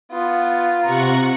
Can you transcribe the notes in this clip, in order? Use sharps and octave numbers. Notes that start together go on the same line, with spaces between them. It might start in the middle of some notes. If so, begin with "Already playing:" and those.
B3 F4
C3 F#5 A#5 C#6